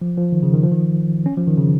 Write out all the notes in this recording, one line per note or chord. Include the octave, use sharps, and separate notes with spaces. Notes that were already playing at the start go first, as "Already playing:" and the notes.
F3
F3
D#3
C#3
D#3
F3
D#3
C#4
F3
D#3
C#3